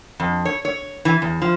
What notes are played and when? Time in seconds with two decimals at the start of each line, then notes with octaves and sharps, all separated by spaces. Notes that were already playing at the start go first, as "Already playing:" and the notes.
0.20 F2
0.45 C#5
0.65 C#5
1.05 E3
1.22 E2
1.42 F3